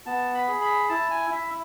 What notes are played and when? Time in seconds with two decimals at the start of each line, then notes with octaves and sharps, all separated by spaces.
0.06 B3 A5
0.34 B5
0.48 G#4
0.61 B5
0.89 E4 A5
1.11 G#5
1.30 E4 E5